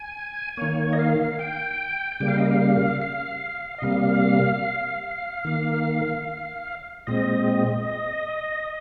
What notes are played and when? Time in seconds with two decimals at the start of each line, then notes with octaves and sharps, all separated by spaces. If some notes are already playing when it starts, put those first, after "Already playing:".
Already playing: G#5
0.57 D#3 A#3 C#5
0.93 D#5
0.99 F5
1.39 G5
2.20 C#3 G3 A#3 G5
2.28 F5
2.38 D#5
2.46 F5
3.02 F5
3.78 D#5
3.82 C3 G3 A#3 F5
5.45 D#3 A#3
7.07 A#2 G#3 C4 D#5